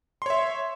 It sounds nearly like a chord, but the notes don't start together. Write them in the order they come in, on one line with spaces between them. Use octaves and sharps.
C6 C#5 E5